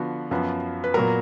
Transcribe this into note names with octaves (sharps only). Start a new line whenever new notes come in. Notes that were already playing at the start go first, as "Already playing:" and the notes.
Already playing: D3 F3 B3 F#4
F#2 F3 B3
B4
A#2 F#3 B3 A#4